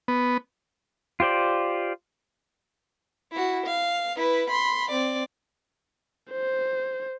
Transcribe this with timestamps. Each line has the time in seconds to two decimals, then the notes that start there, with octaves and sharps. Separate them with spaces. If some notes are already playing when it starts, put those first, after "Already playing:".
0.08 B3
1.20 F4 G4 C5 D5
3.32 E4 F#4
3.67 F5
4.17 E4 B4
4.51 B5 C6
4.91 C4 D5
6.32 C5